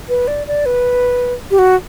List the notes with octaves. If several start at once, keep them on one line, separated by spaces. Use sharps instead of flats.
B4
D5
D5
B4
G4
F#4